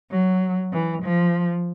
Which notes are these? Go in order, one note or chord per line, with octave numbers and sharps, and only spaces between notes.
F#3
E3
F3